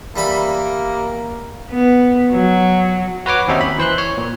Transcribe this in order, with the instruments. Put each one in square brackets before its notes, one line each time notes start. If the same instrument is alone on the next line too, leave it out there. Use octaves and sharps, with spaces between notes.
[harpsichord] E3 G3 B5 [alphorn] A#3
[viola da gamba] B3
F#3
[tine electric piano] F#4 B4 C#5 D6
D#2 C4 C#4 D#4 F#4 E5
B5
E3 C5 C6 F#6
C#5
A#2